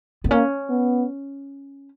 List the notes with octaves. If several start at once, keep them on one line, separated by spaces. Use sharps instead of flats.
B3
A#3 C#4
B3